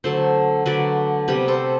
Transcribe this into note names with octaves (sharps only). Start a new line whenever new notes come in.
D3 F#3 A3 A4 C5
D3 F#3 A3 B4 D5
C3 G3 B3 G4 B4
A4 C5